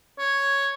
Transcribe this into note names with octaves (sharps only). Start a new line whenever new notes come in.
C#5